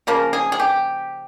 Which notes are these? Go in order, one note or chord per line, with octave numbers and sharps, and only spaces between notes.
C#3 F3 A#3 A#4
G#4
G#4
G4